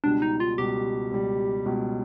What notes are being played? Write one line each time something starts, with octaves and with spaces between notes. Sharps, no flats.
C#2 B2 G3 D4
D#4
F4
C#2 B2 G3 G4
C#2 B2 G3
C#2 B2 G3